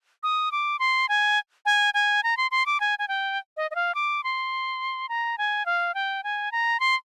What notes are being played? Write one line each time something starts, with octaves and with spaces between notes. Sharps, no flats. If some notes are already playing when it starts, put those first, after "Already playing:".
D#6
D6
C6
G#5
G#5
G#5
A#5
C6
C6
D6
G#5
G#5
G5
D#5
D#5
F5
D6
C6
A#5
G#5
F5
G5
G#5
A#5
C6